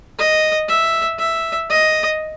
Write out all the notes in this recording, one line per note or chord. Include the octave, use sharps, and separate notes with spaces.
D#5
E5
E5
D#5